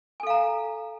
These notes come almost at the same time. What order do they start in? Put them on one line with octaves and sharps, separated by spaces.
G#5 A4 F5 A#5